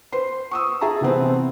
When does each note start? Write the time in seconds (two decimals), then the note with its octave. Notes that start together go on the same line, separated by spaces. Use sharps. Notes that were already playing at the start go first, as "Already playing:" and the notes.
0.12 B4 C5 C6
0.51 C#6 D#6 E6
0.81 G#4 E5 A5 A#5
1.01 C3 E3 B3 C4